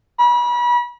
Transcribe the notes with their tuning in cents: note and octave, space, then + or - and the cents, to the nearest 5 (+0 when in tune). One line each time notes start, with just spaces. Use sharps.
B5 -35